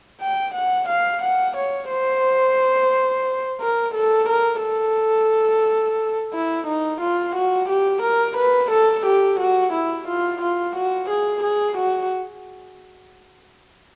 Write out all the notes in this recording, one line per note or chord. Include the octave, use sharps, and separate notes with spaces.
G5
F#5
F5
F#5
C#5
C5
A#4
A4
A#4
A4
E4
D#4
F4
F#4
G4
A#4
B4
A4
G4
F#4
E4
F4
F4
F#4
G#4
G#4
F#4